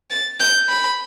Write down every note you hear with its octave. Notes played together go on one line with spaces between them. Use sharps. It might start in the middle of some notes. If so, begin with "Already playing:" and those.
A6
G6
B5